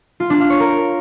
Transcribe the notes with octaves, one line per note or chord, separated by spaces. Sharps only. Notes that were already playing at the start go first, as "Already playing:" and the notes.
F4
D4
F5
C#5
A#4